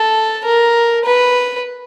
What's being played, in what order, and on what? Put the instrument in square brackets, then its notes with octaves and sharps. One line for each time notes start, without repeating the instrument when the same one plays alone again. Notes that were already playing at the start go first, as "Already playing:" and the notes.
Already playing: [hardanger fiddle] A4
A#4
B4